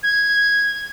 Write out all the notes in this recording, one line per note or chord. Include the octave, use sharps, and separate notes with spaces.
G#6